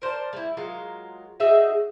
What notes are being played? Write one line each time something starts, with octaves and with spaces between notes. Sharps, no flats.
A#4 C5 D5 A5
G3 E4
F#3 G#3 F4 A#4
D#4 F#4 G#4 E5